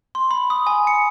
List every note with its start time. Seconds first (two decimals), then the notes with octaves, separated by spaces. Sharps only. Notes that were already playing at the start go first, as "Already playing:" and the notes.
0.15 C6
0.31 B5
0.50 D#6
0.67 G#5
0.87 C#7